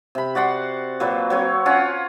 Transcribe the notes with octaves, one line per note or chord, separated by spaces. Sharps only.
C3 B5
F#4 D5 F#5 C6
A#2 F#3 B4
F#3 C4 C#5
C#4 F4 F#5